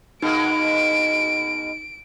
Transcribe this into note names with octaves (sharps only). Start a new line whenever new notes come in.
B2 G#3 A#3 D#4 D7